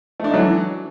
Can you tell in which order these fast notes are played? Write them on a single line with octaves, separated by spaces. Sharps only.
A3 D4 D#4 F#3 E3